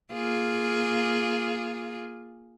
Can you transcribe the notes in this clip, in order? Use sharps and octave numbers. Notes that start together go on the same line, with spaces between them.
A#3 F4 G#4